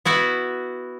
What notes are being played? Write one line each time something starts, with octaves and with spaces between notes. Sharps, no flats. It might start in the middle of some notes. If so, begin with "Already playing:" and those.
B3 E4 F#4